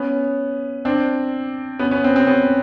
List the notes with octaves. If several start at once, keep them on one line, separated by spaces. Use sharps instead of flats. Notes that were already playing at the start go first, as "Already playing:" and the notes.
Already playing: B3 C#4
C4 D4
B3 C#4
B3 C#4
C4
C4
B3 C#4